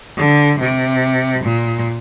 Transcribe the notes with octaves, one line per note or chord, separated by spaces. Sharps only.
D3
C3
A#2